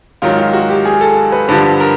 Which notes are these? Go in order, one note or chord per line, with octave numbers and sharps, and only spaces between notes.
G#2 D#3 F#3 F4
F4
F#4
G4
G#4
A4
B4
G2 D3 F3 B4
A#4